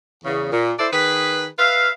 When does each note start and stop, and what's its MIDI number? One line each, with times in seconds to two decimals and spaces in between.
0.25 0.48 40
0.25 0.48 49
0.51 0.73 46
0.78 0.87 64
0.78 0.87 69
0.78 0.87 72
0.78 0.87 74
0.92 1.46 51
0.92 1.46 68
0.92 1.46 71
1.59 1.89 71
1.59 1.89 76
1.59 1.89 77